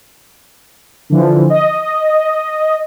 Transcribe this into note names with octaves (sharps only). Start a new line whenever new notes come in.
D3 E3 F3
D#5